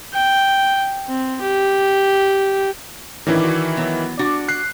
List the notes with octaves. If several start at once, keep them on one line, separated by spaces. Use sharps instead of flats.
G5
C4
G4
A2 D#3 E3 C#4 D4 E4
F#4
F#3 B3
D4 F#4 F#5
F#6 C7